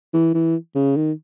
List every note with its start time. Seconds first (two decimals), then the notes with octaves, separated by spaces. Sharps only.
0.13 E3
0.34 E3
0.75 C#3
0.96 D#3